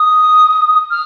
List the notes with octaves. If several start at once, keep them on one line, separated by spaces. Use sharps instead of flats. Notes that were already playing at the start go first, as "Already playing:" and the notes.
Already playing: D#6
F6